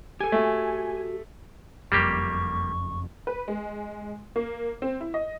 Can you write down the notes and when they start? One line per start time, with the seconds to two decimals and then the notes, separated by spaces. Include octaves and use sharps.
0.20 G4 A4 G#5
0.32 A3 F#4
1.92 F#1 F2 G3 A#3 G4 C#6
3.27 B4
3.48 G#3
4.36 A#3
4.82 C4
5.01 E4
5.14 D#5